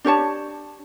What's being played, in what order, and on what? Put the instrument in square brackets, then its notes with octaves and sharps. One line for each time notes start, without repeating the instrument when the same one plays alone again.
[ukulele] D4 G4 C#5 A5